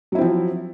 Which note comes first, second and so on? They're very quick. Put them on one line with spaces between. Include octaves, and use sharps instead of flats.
F#3 E4 C4 F3